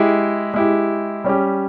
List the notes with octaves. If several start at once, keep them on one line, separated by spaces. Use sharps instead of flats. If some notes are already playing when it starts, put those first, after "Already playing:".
Already playing: G#3 E4 G4
G#3 E4 G4
G3 C#4 G4